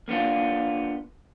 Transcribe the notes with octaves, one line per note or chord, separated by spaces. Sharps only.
A#3 B3 D4 F4